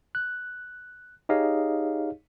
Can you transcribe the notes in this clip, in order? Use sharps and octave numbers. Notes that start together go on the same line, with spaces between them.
F#6
D#4 G4 G#4 C#5 D#5 F5